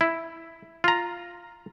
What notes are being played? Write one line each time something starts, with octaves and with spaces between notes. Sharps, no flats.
E4
F4 A#5